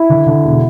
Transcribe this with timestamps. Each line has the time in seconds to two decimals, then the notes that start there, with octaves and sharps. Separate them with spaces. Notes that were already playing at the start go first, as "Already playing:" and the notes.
Already playing: E4
0.09 D3
0.26 D3
0.44 E1